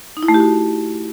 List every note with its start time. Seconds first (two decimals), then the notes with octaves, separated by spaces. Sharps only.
0.17 D#4
0.23 E4
0.28 A3
0.34 G4
0.40 F#4